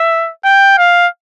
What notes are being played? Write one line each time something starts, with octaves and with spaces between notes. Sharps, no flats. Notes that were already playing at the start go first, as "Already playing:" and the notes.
Already playing: E5
G5
F5